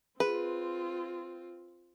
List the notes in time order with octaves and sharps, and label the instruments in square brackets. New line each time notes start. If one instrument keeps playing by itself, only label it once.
[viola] C4 F4 [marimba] G#4 [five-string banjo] B4